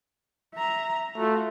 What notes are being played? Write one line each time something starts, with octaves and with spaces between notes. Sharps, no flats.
E5 A#5
A3 F4 F#4